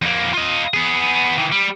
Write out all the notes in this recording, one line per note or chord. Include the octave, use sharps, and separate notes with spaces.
F2 A#3
F4 D#5
B3 G#4
D#3 E3
G3